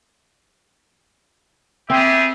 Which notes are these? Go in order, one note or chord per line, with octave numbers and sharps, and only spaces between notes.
G3 C4 G4 G#4 E5